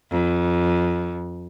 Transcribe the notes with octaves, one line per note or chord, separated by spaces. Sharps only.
F2